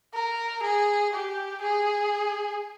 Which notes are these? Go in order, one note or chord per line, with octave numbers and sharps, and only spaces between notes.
A#4
G#4
G4
G#4